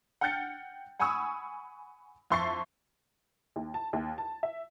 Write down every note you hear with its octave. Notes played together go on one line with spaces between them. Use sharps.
F#5 G5 F6 G6 A6 C#7
F#5 G#5 B5 C#6 D#6 E6
F2 E5 C6 C#6 A6 C7
D#2
A5
D#2
A5
E5